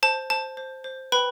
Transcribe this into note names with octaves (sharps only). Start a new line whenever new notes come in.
C5 A5
C5 A5
C5
C5
B4 G5 B5